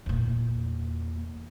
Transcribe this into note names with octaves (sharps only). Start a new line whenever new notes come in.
E2 A#2